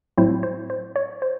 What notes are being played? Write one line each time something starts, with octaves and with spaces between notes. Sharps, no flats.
A2 F#3 C4 E4 C5
C5
C5
C#5
C5